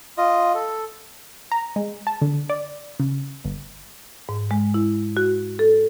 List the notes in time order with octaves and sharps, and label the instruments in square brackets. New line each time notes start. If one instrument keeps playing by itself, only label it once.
[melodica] F4 D#5
A4
[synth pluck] A#5
G#3
A5
D3
D5
C#3
G1
[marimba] G#2
G#3
E4
F#4
A4